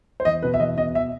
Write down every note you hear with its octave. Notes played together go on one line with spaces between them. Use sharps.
C5
E2 D#5
B2 B4
E5
E2 D#5
B2 D#5
E5